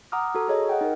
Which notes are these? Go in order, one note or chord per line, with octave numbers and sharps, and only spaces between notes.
F#5 A#5 D6 D#6 F6
F#4 A4 A#5
G#4 C#5 D#5
D#5 F#5 G5
D#4 A#4